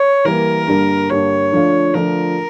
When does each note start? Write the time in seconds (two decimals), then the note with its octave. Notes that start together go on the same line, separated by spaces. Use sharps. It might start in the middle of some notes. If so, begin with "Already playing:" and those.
Already playing: C#5
0.25 E3 G3 A#3 A#4
0.67 G2 D3 G3 A#3
1.09 G2 D3 G3 A#3 C#5
1.52 D3 F3 A3 D4 F4
1.94 D3 F3 A3 D4 F4 A#4